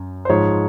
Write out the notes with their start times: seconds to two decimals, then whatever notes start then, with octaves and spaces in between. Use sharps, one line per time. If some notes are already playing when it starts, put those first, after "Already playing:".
Already playing: F#2
0.25 C5
0.30 G#2 F3 C#5